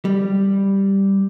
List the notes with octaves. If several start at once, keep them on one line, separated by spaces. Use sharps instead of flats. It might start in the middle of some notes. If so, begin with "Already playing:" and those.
G3